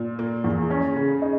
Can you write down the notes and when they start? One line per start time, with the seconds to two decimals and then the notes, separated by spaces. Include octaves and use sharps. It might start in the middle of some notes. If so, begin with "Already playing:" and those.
Already playing: A#2
0.19 A#3
0.44 E2
0.70 C#4
0.96 C#3
1.22 D#4